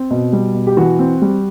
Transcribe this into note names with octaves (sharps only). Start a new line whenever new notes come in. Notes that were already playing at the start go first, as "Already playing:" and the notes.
Already playing: C4
B2
G3
B2
G4
E3 F#4
C4
G3